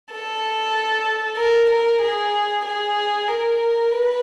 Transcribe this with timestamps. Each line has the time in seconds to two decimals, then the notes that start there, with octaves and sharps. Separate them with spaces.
0.12 A4
1.38 A#4
1.70 A#4
2.02 G#4
2.66 G#4
3.28 A#4
3.92 B4